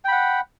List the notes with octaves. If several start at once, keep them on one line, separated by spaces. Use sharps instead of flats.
F#5 G5 B5